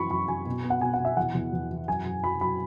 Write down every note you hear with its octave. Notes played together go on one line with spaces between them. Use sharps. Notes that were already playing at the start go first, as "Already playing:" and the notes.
Already playing: F#2 E3 B5 C#6
F#2 B5
F#2 G#5
B2
B3
F#5
B2 G#5
F#5
B2
E5
E2 F#5
E2
E2
E3
F#2 G#5
F#2
F#3 B5
F#3 B5